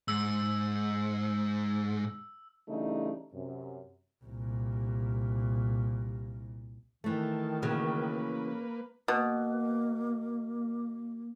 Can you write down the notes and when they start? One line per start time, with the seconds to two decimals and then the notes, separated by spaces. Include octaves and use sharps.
0.08 G#2 E6
2.69 C#3 E3 G3 A3 D4 D#4
3.34 F#2 C3
4.25 C2 A#2
7.04 D#3 E3 A3 A4
7.62 C#3 F#3 A#3 B4
9.08 B2 A#3